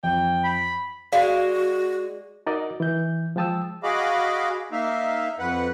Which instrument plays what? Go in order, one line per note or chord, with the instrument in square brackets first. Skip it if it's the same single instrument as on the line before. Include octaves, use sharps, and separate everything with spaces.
[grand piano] F2 [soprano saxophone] G5
[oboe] B5
[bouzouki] G#3 [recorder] F#4 [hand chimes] D5 [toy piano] F5
[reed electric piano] D#4 F#4 A#4 D5 D#5
E3 G6
F3 G#3 G5 A5 D#6 E6
[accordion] F#4 G#4 D#5 F5 B5 D6
A#3 D#4 E5 F5
F2 B4 F#5